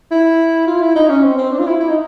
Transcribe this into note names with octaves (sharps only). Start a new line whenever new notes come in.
E4
F4
E4
D#4
C#4
C4
C4
D4
F4
E4
E4
D#4